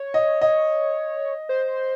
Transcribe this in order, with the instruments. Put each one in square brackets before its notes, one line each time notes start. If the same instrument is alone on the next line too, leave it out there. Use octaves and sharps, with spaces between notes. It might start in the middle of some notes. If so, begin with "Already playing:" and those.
Already playing: [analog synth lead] C#5
[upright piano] D#5
D#5
[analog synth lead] C5